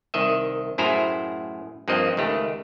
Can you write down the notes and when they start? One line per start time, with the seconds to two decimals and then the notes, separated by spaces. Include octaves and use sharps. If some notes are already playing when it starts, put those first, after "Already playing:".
0.14 C2 D#3 D#5 E5
0.78 F#2 A2 E4 G#4 C5 A#5
1.88 G2 F3 A#3 C4 D#5
2.17 C#2 D#3 A3 G4